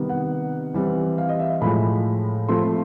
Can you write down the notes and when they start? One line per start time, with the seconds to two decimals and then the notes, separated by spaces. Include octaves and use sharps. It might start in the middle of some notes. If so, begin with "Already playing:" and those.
Already playing: C3 D#3 G3 B3
0.09 F#5
0.74 E3 G3 C4
1.18 F5
1.29 D#5
1.39 E5
1.61 A2 F3 G#3 B5
2.48 F3 A3 C4 C6